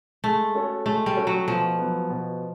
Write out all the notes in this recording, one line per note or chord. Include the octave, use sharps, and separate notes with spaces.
G#3 A3
C#4 F#4 A4 C#5
G#3 A3
G3
C#4 F#4 A4 C#5
F#3
B2 F3
F#3 B3
B2